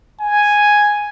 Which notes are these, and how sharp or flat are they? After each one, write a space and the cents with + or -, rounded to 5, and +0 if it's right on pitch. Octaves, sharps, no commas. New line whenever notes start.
G#5 +0